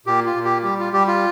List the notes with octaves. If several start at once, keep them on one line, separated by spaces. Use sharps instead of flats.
A#2 G4
F4
A#2
G4
G3 G4
F4
G3 G4
F4